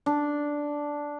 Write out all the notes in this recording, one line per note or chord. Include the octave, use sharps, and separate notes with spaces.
D4